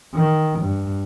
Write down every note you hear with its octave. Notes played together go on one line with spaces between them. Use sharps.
D#3
G2